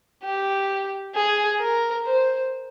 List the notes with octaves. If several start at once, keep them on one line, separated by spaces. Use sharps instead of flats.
G4
G#4
A#4
C5